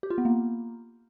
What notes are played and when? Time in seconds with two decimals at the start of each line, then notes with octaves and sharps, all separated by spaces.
0.03 G4
0.10 F4
0.18 B3
0.25 A#3